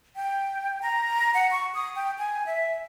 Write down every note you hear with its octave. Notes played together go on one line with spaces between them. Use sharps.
G5
A#5
F#5
C#6
D#6
G5
G#5
E5